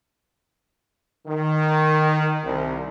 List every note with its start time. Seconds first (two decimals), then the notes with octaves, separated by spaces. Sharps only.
1.26 D#3
2.43 C2